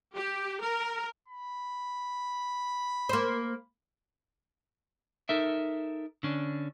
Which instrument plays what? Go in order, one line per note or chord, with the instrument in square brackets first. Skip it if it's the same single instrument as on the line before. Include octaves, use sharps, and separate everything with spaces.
[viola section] G4
A#4
[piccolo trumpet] B5
[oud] A#3 C5
[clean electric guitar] D#4 A4 A#4 E5
D3 C#4 D4